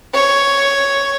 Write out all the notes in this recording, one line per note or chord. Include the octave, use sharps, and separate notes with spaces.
C#5